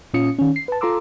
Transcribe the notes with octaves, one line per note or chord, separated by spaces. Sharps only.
A#2 C#4 F4 D#6 C#7
D#3 C#4
C7
B4 A5
F4 A4 A#5 C6 D6 E6